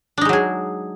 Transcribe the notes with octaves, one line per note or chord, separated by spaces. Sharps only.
F#3 G#3 D4 D#4 G#4